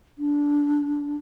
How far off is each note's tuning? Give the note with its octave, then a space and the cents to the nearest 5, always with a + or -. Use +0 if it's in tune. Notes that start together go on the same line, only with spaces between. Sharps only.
D4 -15